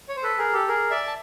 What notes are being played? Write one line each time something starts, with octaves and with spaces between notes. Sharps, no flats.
C#5
C5
A4 B4
G#4 A#4
G4 A4
G#4 A#4
D5 E5
A5